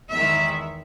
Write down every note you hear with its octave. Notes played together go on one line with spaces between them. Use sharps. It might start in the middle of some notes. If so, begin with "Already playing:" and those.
E2 D#3 G#3 E5